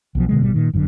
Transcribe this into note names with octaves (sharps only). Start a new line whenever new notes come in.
B1 B2 F3
B2 D3 F3 G#3
G#1 B2 G3
A#2 D#3
G1 F#2 D3